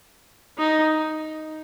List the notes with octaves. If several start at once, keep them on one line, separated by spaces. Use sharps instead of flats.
D#4